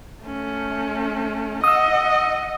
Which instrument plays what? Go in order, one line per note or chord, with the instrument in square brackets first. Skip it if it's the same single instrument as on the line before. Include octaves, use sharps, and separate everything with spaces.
[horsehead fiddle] A3 C#4
[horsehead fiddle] D#5 F#5 [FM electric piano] D#6 E6